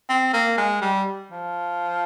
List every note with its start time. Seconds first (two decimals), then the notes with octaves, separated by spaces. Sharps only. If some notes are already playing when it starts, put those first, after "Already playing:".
0.09 C4
0.33 A#3
0.58 G#3
0.81 G3
1.31 F3